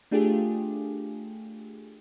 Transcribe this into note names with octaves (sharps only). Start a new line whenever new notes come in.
A3 D4 F4 G4 G#4